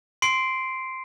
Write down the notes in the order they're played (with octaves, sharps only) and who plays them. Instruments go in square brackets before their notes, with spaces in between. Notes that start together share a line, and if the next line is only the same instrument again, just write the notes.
[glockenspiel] C6 C7 D7